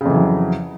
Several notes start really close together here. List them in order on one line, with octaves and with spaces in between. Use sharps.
C#3 F2 E3 F#3